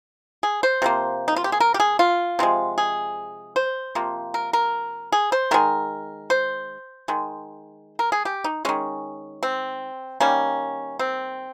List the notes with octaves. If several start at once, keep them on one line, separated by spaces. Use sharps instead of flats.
G#4
C5
C3 F3 A#3
D#4
F4
G4
G#4
A#4
G4
G#4
F4
C3 F3 G#3
G#4
C5
C3 F3 A#3
A#4
A#4
G#4
C5
D#3 G#3 A#4
C5
D#3 G#3
A#4
G#4
G4
D#4
D#3 G#3 C#4
C4
D#3 G3 A#3 C#4
C4